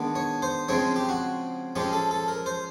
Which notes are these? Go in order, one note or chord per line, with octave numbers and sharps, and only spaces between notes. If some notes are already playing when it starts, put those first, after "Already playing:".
Already playing: D#3 G#3 B3 D4
C#5
C5
C#3 F3 G#3 C4 C#5
G4
F#4
F3 G#3 C#4 G4
A4
A4
A#4
C5